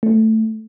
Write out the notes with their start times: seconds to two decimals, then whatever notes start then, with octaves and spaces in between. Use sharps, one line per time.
0.03 A3